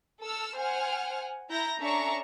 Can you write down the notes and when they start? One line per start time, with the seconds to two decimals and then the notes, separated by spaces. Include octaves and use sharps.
0.21 A4 E6 F6
0.57 C5 F#5 G#5 F6
1.49 E4 A#5 G6 A#6
1.79 C#4 D4 A4 E5 A#5 C#6